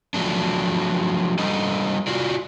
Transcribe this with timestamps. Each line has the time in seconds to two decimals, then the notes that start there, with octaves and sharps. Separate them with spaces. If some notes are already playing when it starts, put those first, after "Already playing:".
0.14 F3 F#3 A3 D4
1.39 G3 D4 A4 D#5
2.07 F4 F#4 D5